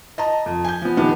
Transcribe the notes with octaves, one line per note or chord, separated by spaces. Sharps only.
D#5 A5 A#5
F2
G#5 G6
F3 B3
D#1 D#3 B3